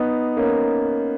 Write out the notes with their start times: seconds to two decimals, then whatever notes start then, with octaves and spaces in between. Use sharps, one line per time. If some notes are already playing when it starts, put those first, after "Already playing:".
Already playing: B3 D#4
0.37 A#3 C#4